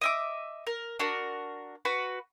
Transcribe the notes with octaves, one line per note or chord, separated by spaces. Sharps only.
D#5 E5 D6
A#4
D4 F#4 A#4
F#4 B4 B5